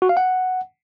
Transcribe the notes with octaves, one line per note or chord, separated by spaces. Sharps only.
F#4
F5
F#5